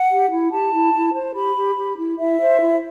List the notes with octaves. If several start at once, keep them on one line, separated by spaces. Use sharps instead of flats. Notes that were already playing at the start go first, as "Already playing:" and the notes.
Already playing: F#5
G4
E4
G4 A5
E4
E4
C5
G4 B5
G4
G4
E4
E4 E5
C5
E4